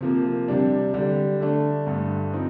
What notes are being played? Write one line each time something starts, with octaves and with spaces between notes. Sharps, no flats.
C3 F3 A#3
C3 G3 D4
D3 G3 D4
D3 A3 D4
G2 D3 A3
F3 C4 D#4